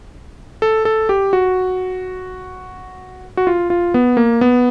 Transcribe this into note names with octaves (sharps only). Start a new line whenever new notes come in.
A4
A4
G4
F#4
F#4
F4
F4
B3
A#3
B3